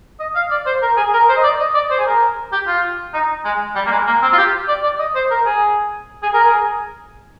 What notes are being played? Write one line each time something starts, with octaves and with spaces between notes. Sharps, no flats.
D#5
F5
D5
C5
A#4
G#4
A#4
C5
D#5
D5
D#5
D5
C5
G#4
A#4
G4
F4
D#4
G#3
G3
A#3
G#3
A#3
C4
F4
G4
D5
D5
D#5
C5
A#4
G#4
G#4
A#4
G#4